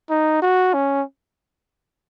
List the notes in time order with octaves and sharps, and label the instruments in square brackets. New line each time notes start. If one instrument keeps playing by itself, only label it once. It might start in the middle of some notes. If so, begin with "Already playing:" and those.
[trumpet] D#4
F#4
C#4